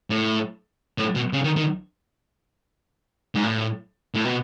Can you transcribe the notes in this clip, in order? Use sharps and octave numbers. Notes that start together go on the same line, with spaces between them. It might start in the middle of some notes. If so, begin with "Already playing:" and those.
A2
A2
B2
C#3
D#3
D#3
G#2
A2
A2
B2